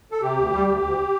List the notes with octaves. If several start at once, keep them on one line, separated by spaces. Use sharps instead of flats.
A4
C3 G4
D2
G3
D2
D2